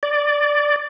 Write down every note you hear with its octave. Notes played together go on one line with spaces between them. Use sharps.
D5